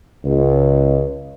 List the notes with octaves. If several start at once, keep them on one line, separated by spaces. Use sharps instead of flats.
C#2